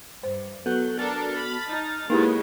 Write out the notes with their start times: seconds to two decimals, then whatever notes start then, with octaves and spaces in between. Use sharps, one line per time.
0.23 G2 C5
0.66 F#3 B3 F#4 A4 F#6 G6
0.99 D4 A4 A#4 A5 F6 A6
1.37 B5
1.67 D#4
2.10 C#3 G#3 A#3 B3 D#4 E4 G4 B4